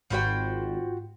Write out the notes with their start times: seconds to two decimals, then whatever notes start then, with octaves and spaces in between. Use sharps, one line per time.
0.10 G#1 G#2 F4 F#4 C5 G5 B5